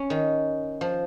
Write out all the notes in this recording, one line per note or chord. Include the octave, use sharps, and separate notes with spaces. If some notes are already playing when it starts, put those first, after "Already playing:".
Already playing: C#4
D#3
F3